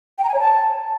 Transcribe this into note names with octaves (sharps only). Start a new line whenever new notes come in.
G5
A#5
G#5
C#5
A5